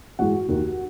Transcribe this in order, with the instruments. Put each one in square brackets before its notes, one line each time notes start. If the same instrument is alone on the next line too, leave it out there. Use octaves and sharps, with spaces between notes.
[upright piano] G#2 E3 F#4 F#5
D#2 D#3